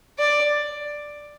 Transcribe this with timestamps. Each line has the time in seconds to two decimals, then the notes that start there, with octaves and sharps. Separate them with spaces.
0.19 D5